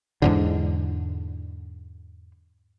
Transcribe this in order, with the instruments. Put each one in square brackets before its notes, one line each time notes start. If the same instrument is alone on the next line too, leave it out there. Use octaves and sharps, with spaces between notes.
[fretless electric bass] E2 G#2 D3